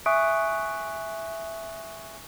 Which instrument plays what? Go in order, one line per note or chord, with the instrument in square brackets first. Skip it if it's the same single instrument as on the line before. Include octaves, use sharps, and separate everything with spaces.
[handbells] E5 G#5 C#6 D#6 F#6 D7